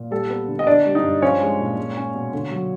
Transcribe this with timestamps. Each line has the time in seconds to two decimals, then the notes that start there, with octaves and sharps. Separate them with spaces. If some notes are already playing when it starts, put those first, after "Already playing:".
Already playing: A#2
0.11 G3 A4
0.30 B3
0.48 D3
0.59 D#5
0.67 D3 D4 D5
0.86 G3
0.95 D#4 D#5
1.03 G2
1.22 F3 C#4 C#5
1.41 G#3
1.59 A#2
1.77 G#3
1.97 C#4
2.15 B2
2.33 D3
2.51 F#3